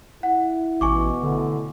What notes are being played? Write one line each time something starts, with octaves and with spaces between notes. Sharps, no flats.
E4 F#5
A1 B2 G#5 C#6 D6
A2 D3